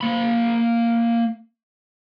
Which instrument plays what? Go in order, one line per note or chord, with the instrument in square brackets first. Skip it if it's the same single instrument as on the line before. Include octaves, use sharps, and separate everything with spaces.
[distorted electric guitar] A#3 B5